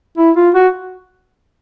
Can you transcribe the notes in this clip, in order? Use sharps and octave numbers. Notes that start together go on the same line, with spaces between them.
E4
F4
F#4